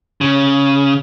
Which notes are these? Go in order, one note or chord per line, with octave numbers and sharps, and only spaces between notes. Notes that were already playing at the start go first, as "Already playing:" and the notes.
C#3